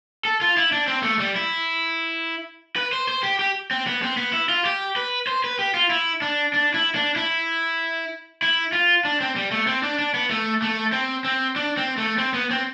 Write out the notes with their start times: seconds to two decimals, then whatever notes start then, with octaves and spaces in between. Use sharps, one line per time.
0.25 A4
0.41 F4
0.57 E4
0.72 D4
0.88 C4
1.03 A3
1.19 G3
1.36 E4
2.76 B4
2.93 C5
3.08 C5
3.23 G4
3.39 G4
3.71 C4
3.87 B3
4.02 C4
4.17 B3
4.33 E4
4.49 F4
4.66 G4
4.96 B4
5.27 C5
5.44 B4
5.59 G4
5.74 F4
5.90 E4
6.22 D4
6.54 D4
6.74 E4
6.95 D4
7.16 E4
8.42 E4
8.73 F4
9.05 D4
9.21 C4
9.36 G3
9.51 A3
9.67 C4
9.83 D4
9.99 D4
10.14 B3
10.30 A3
10.62 A3
10.92 C4
11.25 C4
11.56 D4
11.77 C4
11.98 A3
12.18 C4
12.34 B3
12.51 C4